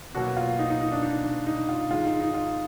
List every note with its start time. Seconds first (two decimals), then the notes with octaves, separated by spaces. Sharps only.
0.15 B2 F#3 A#3 F#4
0.37 F4
0.59 D#4
0.70 D#4
0.81 D#4
0.92 D4
1.03 D#4
1.47 D#4
1.69 F4
1.91 G#2 D#3 G#3 F4
2.05 D#4
2.20 D#4
2.34 F4